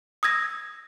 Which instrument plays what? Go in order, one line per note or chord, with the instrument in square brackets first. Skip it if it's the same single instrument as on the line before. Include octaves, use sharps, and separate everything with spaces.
[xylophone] D#6 E6 G#6 A#6